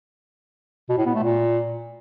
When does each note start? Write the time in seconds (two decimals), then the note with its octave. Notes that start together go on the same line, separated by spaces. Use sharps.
0.89 B2
0.98 A2
1.06 B3
1.14 A3
1.23 A#2